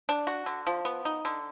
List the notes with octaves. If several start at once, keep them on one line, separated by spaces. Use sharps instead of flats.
D4
F#4
D3
F3
B3
D#4
D3